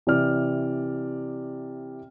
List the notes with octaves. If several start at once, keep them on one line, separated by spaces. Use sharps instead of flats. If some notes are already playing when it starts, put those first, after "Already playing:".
C3 E3 D5 F6